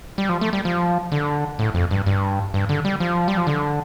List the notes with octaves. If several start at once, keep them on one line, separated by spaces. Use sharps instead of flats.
G3
F3
A3
G3
F3
D3
A2
F2
G2
G2
G2
D3
G3
F3
G3
F3
D3